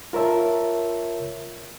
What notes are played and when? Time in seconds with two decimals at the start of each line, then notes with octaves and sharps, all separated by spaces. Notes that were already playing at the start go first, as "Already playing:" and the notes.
0.13 F4 A#4 C#5 E5 A5